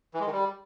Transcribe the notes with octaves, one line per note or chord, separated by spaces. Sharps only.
E3
G#3
D#3
G3